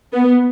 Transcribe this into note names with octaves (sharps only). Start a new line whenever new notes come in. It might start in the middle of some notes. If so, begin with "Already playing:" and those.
B3